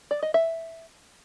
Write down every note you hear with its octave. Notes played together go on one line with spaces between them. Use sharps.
D5
D#5
E5